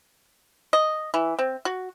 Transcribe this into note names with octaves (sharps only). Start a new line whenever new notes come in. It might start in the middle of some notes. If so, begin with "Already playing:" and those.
D#5
E3
C4
F#4